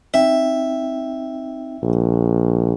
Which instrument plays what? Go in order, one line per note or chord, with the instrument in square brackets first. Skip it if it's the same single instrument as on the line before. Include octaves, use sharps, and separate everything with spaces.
[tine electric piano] C4 D#4 G5 [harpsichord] E5
[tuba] A#1